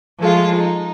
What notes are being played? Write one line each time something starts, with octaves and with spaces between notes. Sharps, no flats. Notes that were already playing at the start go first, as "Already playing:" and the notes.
F3 G#3 A3 F4
D#4